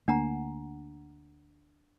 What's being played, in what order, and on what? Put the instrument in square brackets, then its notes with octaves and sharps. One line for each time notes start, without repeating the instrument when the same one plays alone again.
[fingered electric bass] D2 A#3 [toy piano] D4 F#5 A#5